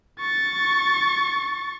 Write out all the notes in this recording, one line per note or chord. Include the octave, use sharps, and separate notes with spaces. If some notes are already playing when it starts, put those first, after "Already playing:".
C#6 A6